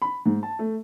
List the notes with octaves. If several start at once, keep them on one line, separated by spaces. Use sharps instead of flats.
B5
G#2
A5
A3